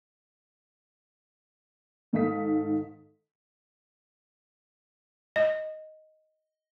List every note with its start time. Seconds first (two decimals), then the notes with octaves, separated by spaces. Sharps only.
2.13 G#2 D#3 A4 F5 D#6 B6
5.36 D#5